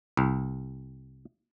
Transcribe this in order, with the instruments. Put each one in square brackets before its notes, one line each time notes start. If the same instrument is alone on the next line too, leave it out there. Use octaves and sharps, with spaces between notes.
[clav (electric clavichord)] C2